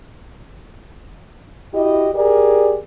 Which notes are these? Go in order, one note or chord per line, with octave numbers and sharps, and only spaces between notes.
E4 F#4 G4 D#5
G4 G#4 A#4 D5